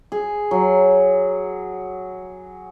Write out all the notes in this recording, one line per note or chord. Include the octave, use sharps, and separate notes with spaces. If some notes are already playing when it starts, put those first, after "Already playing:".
G#4
F#3